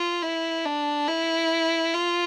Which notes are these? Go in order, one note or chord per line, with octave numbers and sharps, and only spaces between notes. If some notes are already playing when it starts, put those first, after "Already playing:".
Already playing: F4
E4
D4
E4
F4